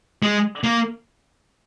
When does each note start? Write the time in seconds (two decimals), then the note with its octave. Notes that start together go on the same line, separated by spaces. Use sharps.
0.23 G#3
0.64 A#3